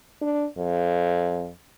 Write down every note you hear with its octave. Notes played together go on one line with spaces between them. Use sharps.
D4
F2